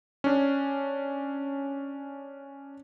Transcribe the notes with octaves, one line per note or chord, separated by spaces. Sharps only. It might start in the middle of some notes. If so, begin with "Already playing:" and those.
C#4 D4